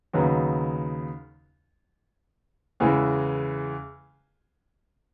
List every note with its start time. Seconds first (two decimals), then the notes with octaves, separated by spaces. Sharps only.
0.13 D#2 C#3 F#3 B3 D#4
2.80 E2 C#3 E3 G#3